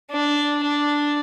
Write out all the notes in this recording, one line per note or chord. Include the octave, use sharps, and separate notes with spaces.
D4
D4